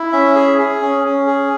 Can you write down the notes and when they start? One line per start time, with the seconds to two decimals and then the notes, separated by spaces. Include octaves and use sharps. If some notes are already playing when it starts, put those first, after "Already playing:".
Already playing: E4
0.12 C#4 E5
0.35 G#4
0.59 G#4
0.82 C#4
1.04 C#4
1.27 G#4